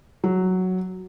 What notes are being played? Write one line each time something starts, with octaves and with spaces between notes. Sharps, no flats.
F#3